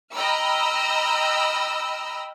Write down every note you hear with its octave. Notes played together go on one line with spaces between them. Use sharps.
D#5 G5 A#5 B5 E6 F6